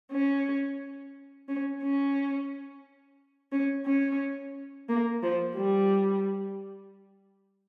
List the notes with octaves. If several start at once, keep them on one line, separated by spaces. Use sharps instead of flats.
C#4
C#4
C#4
C#4
C#4
A#3
F3
G3